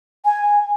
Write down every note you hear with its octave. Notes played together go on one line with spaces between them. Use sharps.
G#5